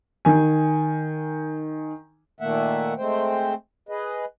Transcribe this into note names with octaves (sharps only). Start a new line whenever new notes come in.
D#3 G#5
A#2 D#3 A3 A#3 E5 F#5
G#3 A3 C4 C5 G5
G#4 B4 D#5